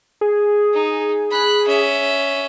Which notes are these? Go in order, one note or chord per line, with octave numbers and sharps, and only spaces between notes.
G#4
D#4
B5 F#6
C#4 E5